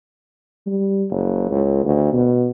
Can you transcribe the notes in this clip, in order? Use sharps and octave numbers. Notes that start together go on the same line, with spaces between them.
G3
F#1
C#2
D2
B2